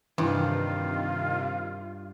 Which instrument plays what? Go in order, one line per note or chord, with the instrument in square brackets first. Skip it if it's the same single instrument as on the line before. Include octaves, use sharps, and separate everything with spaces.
[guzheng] G2 [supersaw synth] C3 D#3 [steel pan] E3 [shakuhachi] F4